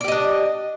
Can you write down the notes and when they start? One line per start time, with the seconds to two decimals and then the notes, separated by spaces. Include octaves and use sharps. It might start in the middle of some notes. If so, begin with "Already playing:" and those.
0.01 D5
0.04 G4
0.08 D#5
0.12 D4